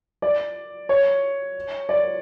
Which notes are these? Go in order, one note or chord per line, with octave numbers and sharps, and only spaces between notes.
D5
C#5
D5